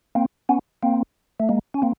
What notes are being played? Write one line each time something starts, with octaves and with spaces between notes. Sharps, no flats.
A#3 C4
B3 C#4
A#3 C4
A3
G#3 A#3
C#4
A#3 C4